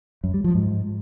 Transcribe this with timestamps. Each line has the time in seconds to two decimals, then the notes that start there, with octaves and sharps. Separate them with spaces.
0.24 F#2
0.34 G3
0.44 F3
0.55 G#2